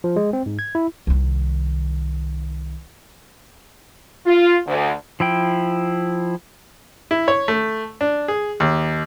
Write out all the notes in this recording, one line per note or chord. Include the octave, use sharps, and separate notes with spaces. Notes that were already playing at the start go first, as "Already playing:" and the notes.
F3
G#3
C4
G#2
G#6
E4
C2 D#3
F4
D2
F3 E4 G5
E4
C#5
A3
D4
G#4
D#2